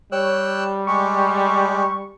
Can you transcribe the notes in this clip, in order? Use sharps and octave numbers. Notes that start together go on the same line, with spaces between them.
G3 C#5 G5 E6 F#6
G#3 G4 C#6